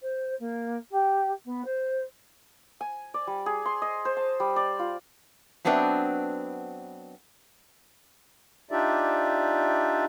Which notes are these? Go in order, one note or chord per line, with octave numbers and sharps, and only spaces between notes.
C5
A#3
G4
B3
C5
G#5
D5
G3
G#4
C6
D#5
C5
A5
G3
D5
F4
F#3 B3 C4 D4 B4 E5
D4 D#4 F4 G4 D5 E5